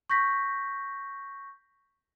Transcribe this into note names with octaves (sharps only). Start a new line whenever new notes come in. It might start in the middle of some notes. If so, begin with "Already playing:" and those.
C#6 G6 A#6 B6